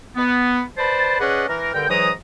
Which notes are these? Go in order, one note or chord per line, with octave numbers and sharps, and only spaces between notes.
B3
B4 C5 D5 A5
C#4 G#4 B4 D5 D#5 F#5
E3 A#4
G2 D3 A#4 G5
G#2 E3 F#3 A#5 D#6